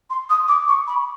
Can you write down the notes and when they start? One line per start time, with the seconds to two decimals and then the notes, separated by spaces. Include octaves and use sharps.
0.10 C6
0.30 D#6
0.48 D6
0.68 C#6
0.87 B5